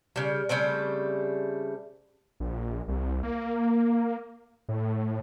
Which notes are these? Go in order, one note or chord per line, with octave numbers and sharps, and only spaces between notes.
C#3 G3
C#3 G3 A3 C4
A#1
C2
A#3
A2